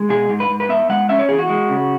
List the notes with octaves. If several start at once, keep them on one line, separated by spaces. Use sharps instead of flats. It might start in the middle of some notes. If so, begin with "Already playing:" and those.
Already playing: G#3
B2 G#4
G#2
B4
G#2
B4
B3 E5
G#3 F#5
C#4 E5
C#5
E2 G#4
F#4
G#3
C#3